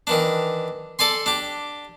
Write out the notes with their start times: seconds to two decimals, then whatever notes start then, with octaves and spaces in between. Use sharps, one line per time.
0.07 D#3 E3 D4
0.99 A4 D5 G#5 C6
1.26 D4 G4